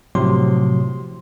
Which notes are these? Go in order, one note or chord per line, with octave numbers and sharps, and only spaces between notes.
A2 C3 F3 F#3 C6